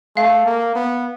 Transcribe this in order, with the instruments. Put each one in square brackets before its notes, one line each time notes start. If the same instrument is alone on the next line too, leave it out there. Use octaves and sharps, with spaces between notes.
[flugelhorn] A3 [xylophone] F5
[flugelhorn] A#3
B3